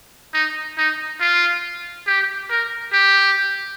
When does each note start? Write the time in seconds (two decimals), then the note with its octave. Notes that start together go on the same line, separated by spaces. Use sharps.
0.33 D#4
0.78 D#4
1.20 F4
2.07 G4
2.50 A#4
2.92 G4